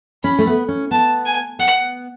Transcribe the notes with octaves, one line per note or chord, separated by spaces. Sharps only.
C#4 B5
A3
B3
C#4
B3 A5
G#5
B3 F#5